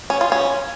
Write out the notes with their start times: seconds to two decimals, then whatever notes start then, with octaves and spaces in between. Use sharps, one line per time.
0.10 C#4
0.21 F4
0.32 C#4